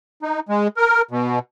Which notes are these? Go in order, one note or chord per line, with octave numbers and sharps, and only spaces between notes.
D#4
G#3
A#4
B2